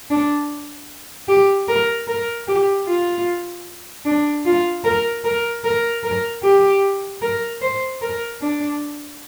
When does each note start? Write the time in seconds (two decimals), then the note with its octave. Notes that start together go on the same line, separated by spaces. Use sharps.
0.10 D4
1.28 G4
1.68 A#4
2.08 A#4
2.48 G4
2.87 F4
4.05 D4
4.45 F4
4.84 A#4
5.25 A#4
5.64 A#4
6.04 A#4
6.43 G4
7.22 A#4
7.62 C5
8.02 A#4
8.41 D4